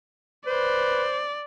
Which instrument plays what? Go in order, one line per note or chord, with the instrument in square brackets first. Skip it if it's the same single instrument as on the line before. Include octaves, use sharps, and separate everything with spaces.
[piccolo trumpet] B4 [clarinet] C5 [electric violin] D5